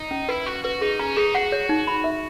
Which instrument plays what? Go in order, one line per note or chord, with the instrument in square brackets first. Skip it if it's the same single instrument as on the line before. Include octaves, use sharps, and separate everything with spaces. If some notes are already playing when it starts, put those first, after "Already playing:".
Already playing: [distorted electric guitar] D#4
[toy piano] C#4
[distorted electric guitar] E4 [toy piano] B4
[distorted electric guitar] F#4 [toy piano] C#6
[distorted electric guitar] F#4 [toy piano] B4
[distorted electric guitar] D#4 [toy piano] G#4
[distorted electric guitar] C#4 [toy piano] A#5
[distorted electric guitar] D#4 [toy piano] G#4
[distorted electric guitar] F#4 [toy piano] F#5
[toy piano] C#5
D#4
B5
E5